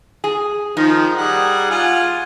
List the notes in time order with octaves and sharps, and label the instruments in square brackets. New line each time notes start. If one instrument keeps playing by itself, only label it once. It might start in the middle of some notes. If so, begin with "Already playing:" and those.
[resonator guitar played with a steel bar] G#4
[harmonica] D#3 F3 [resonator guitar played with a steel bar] D#4
[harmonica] G3 G#4 F#5
F4 F#5 G#5